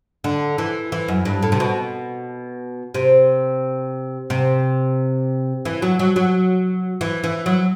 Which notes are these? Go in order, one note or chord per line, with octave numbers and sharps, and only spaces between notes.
D3
E3
E3
F#2
G2
A2
C3
B2
C3
C3
E3
F#3
F#3
F#3
E3
E3
F#3